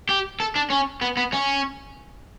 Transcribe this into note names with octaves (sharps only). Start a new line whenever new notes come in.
G4
A4
D4
C#4
B3
B3
C#4